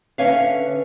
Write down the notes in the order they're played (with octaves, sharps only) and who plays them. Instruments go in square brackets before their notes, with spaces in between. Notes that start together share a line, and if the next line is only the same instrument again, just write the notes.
[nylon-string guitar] D3 C#4 B4 C#5 E5 F5